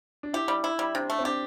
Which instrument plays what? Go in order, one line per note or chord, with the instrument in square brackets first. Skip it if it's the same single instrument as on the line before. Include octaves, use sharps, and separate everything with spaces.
[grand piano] D4
[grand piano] E4 [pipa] G4
[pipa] G3
E4
G3
[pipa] C3 [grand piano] D4
[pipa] A3
[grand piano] C4
[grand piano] D4 [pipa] G4